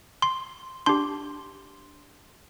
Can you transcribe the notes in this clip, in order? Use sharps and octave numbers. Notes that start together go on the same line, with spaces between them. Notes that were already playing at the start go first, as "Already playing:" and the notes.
C6
D4 G4 C6